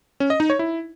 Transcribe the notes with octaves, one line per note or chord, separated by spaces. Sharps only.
C#4
D#5
D#4
C#5
E4